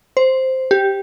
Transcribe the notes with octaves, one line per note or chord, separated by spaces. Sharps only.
C5
G4